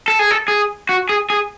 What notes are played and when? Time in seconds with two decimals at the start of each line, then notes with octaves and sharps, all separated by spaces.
0.08 A4
0.19 G#4
0.31 A4
0.48 G#4
0.89 F#4
1.09 G#4
1.30 G#4